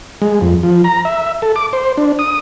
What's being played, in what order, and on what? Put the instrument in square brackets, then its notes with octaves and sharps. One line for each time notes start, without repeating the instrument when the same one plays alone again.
[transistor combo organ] G#3
F2
F3
A#5
E5
A4
D6
C5
D4
D#6